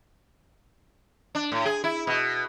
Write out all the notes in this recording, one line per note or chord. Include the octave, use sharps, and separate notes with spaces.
D4
A2
G#4
E4
B2